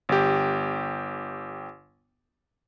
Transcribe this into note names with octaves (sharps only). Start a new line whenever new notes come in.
G1 G4